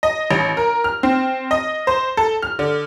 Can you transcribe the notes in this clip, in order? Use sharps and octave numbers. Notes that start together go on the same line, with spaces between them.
D#5
A1
A#4
F6
C4
D#5
C5
A4
F6
D3